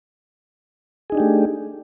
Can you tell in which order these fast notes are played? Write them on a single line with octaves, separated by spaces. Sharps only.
G#4 D#4 D4 G4 A3